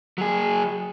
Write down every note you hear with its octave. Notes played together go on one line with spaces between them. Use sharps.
F#3 G#4